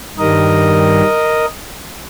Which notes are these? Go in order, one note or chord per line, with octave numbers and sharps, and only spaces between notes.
G2 D#3 G3 A#4 D#5